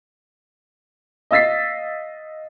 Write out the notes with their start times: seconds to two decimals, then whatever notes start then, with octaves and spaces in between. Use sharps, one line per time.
1.31 D#5 F5 E6 A6 B6 C7